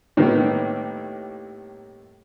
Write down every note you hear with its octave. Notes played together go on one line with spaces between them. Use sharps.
A2 C3 D#3 G3 A#3 B3